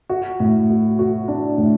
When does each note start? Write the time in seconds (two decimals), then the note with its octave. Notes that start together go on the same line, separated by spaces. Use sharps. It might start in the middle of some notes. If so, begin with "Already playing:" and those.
0.09 F#4
0.40 A2
0.70 F#4
0.99 F#4
1.28 D4
1.58 A2